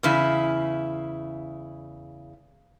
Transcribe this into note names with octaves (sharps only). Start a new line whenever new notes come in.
E2 C#3 E4